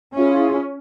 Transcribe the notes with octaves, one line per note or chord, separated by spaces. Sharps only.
C#4 E4 F4 G#4